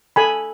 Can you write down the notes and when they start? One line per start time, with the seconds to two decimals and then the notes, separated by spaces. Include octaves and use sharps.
0.16 A4 G#5 B5